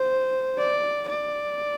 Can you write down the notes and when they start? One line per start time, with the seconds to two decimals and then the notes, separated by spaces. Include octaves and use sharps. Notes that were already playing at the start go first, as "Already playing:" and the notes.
Already playing: C5
0.58 D5
1.09 D5